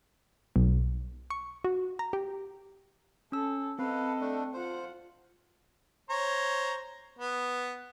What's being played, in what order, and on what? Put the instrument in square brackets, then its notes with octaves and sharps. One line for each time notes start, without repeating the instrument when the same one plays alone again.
[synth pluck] B1
C#6
F#4
A#5
G4
[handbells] C#4 E6 [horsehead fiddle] A4
[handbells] C4 [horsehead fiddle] A4 D#5 [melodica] B4 F5
[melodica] A3 D4
[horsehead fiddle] F4 F#5 [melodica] C5
[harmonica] C5 C#5 A#5
B3